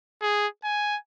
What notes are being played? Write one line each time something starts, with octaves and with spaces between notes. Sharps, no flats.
G#4
G#5